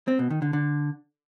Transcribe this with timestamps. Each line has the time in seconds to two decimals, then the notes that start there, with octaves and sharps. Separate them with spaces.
0.08 C4
0.19 B2
0.30 D#3
0.42 D3
0.53 D3